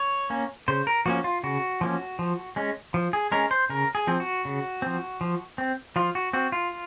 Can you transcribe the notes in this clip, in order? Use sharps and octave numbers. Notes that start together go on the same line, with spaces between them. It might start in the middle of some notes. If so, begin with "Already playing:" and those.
Already playing: C#5
A#3 C#4
C#3 C5
A#4
F3 A#3 C#4 F#4
F4
C#3 F#4
F3 A#3 C#4
F3
G#3 C#4
F3
G#4
G#3 C#4 A#4
C5
C#3 A#4
G#4
F3 C4
F#4
C#3
F3 C4
F3
C4
F3 F4
F#4
C4 F#4
F4